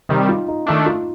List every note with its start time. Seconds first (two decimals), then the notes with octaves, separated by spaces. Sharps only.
0.09 C3 D#3 G3 D#4
0.29 F4
0.48 D#4
0.67 D#3 A3 D4 D#4
0.86 F4